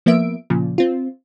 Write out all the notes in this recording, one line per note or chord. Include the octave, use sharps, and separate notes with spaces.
F3 A#3 B3 E5 D7
A#2 C#3 F3
C4 F4